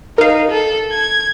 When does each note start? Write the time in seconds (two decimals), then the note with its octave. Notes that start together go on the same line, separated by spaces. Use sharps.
0.18 D#4 A#4 F5
0.51 A4
0.92 G#6